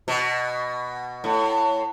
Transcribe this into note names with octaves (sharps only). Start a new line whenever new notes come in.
B2
A2